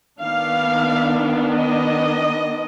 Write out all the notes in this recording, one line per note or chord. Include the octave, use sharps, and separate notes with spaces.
D#3 B3 D4 F5
D#5